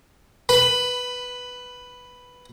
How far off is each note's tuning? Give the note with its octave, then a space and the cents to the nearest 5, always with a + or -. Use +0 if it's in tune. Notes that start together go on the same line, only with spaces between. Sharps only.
B4 +0 B5 +15